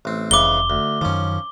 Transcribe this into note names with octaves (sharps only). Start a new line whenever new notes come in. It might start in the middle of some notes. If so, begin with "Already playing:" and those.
A1 C4
F1 G#2 C#3 E3 D6 G7
D2
F#2 D#3 F3 C#4